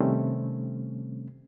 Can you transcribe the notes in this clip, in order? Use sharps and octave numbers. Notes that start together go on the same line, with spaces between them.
C3 D#3 G3 A3 C4 C#4